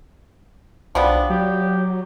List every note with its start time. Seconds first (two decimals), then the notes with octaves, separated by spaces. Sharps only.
0.95 B1 F3 G3 B3 D4
1.30 F#3 G4